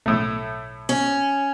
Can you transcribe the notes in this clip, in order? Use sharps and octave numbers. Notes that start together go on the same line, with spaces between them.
B1 A2 A3
C#4